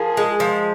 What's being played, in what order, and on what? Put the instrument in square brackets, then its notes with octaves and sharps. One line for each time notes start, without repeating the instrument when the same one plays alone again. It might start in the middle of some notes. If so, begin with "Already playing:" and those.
Already playing: [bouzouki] F3 [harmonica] G#4 A#4
[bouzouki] G#3
F3